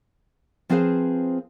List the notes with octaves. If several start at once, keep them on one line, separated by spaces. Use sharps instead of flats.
F3 C4 G#4 B4 C5 F5